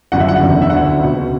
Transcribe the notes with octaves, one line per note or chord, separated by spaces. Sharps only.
G1 F#2 C#3 F#5
E5
F#5
F#1 E2 D3
E5
D2 D3 F#5
C#2 B2